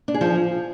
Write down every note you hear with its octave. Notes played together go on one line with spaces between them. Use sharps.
D4
G#4
F3